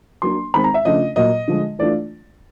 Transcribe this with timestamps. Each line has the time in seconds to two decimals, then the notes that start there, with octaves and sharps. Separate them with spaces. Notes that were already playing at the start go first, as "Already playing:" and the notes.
0.22 F#3 A#3 D4 C6
0.54 D#3 G#3 C4 B5
0.64 A#5
0.74 E5
0.85 C#3 F3 A3 D4 F4 D#5
1.16 A#2 F#3 A#3 D#5
1.48 D3 F3 G#3
1.79 E3 A3 D4 F4 D5